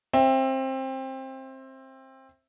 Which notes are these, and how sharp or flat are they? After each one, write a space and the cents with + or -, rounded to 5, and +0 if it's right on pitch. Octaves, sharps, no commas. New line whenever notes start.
C4 +20 E5 +0